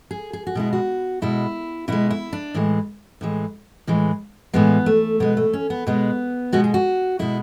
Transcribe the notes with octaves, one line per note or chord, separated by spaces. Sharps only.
G#4
G#4
F#4
B2 G#3 E4
F#4
B2 G#3 E4
B2 G#3 E4
E4
D4
A2 E3 G#3
A2 E3 G#3
A2 E3 G#3
A2 E3 G#3 B3
A3
B2 G#3 B3
A3
C#4
B3
B2 G#3 B3
B2 G#3 F#4
G#4
F#4
B2 G#3 E4